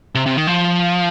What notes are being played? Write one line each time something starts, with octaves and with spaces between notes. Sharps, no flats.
C3
C3
D#3
F3